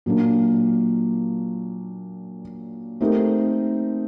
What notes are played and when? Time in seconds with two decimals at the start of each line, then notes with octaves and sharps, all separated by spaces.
0.06 A#2 F#3 A#3 D4
3.01 A3 C4 D#4 G4 A#4